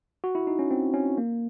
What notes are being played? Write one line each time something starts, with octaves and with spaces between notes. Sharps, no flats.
F#4
E4
D#4
C#4
C4
C#4
A#3